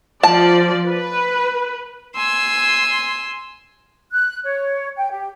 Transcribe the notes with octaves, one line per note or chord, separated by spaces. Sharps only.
F3 D5 A5
B4
G#5 C6 E6
F#6
C#5
G5
G4